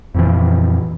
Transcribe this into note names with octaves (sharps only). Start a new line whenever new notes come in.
F2 A#2 E3